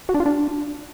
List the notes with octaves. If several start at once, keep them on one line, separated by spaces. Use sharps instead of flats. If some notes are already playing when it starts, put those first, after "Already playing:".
F#4
D4
F4
D4